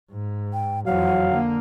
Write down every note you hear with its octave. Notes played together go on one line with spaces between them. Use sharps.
G#2
G5
F2 E3 F#3 F5 F#5
D3 A#3